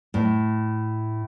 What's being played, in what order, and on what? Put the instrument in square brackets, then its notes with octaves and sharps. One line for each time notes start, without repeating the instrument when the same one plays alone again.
[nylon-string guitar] A2